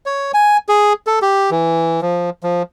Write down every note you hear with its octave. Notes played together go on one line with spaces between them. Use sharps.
C#5
G#5
G#4
A4
G4
E3
F3
F3